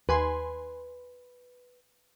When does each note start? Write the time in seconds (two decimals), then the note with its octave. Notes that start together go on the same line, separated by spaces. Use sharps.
0.09 D#2 B4 G#5 C6